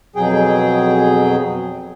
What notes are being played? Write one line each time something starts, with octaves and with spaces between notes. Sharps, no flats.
F2 B2 F#3 G#4 G5